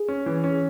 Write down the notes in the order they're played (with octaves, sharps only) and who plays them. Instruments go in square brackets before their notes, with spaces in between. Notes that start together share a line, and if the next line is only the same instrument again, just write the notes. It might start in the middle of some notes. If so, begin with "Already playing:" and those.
Already playing: [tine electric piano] G#4
[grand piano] C#4
E3
C#4